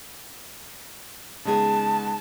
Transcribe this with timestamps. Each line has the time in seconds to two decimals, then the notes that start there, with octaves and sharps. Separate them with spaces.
1.45 C#3 G#3 B3 D#4 G#4 A5